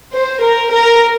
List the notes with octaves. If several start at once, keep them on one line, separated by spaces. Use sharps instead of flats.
C5
A#4
A#4